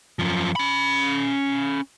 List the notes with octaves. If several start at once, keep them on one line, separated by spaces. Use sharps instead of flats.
F#2 F3
C#4 B5